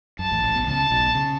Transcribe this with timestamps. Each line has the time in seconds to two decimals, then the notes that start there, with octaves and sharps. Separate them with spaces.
0.19 F#2 A5
0.31 A1 A2
0.43 A1 A2
0.55 B1 B2
0.67 C#2 C#3 A5
0.90 B1 B2
1.15 C#3